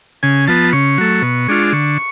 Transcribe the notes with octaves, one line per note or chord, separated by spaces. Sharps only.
C#3 G#5
F3 B3 A5
C#3 C#6
F#3 A3
B2
G#3 D4 F4
D3 C#6